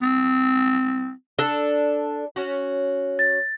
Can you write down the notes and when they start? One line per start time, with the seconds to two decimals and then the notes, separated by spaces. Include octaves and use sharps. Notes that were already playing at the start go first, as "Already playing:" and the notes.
0.02 C4
1.39 D4 A4
2.36 C#4 F#4
3.19 A6